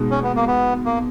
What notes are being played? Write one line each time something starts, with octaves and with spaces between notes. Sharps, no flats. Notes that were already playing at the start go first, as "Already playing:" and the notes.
Already playing: B2 G#3 D#4
C#4
B3
A#3
B3
A#3